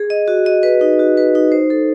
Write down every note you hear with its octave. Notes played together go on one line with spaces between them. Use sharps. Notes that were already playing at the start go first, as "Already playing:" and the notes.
Already playing: G#4
D#5
F#4
D#5
B4
D#4
F#4
B4
D#4
C5
A4